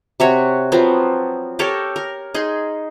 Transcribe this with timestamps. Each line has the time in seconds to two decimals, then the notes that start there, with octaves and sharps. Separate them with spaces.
0.20 C3 F#4 C#5
0.72 F3 F#3 B3 C4
1.59 G4 A4 A#4 C#5
1.96 A#4
2.34 D#4 G#4 C6